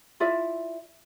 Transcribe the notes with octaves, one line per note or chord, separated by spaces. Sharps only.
E4 F4 D5 E5